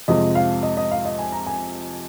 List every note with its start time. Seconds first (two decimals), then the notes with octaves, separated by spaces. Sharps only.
0.08 F2 C3 F3 G#3 D#5
0.35 F5
0.63 D#5
0.77 D#5
0.91 F5
1.05 D#5
1.19 G#5
1.32 A#5
1.46 G#5